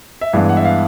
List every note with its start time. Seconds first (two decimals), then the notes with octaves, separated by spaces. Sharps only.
0.21 E5
0.33 G2 E3 G#3 B3 F5
0.49 F#5
0.57 E5
0.65 F5